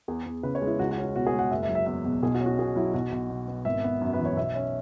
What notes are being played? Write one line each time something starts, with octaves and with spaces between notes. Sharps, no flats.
E2 G#4
E2
C#3 B4
C#5
G#3
E4
C#2 F#4
F#4
C#4
F#4
B2 F#4
G#4
G#3
F#5
F#1 E5
E5
F#3
E5
E2 E5
B2
B1 G#4
F#4
C#4
F#4
B2 G#4
F#3 E4
B1 F#4
B1
B2
B3
G#1 E5
B3
F#2
B4
E3
C#5
B1 E5
C#4